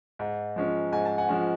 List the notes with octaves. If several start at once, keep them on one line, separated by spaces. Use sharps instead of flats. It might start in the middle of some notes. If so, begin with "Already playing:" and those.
G#2
F3 G#3 C#4
G#2 G#5
A5
F#5 G#5
F3 G#3 C#4